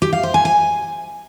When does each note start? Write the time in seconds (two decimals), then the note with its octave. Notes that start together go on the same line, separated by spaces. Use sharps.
0.02 G4
0.13 F5
0.23 C5
0.34 G#5
0.45 G#5